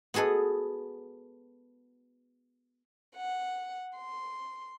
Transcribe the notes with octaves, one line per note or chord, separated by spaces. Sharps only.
B3 F#4 G#4 A4 B4
F#5
C6